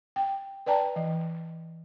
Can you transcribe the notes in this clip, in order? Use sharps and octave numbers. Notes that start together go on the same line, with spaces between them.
G5
B4 D5 G5 A5 A#5
E3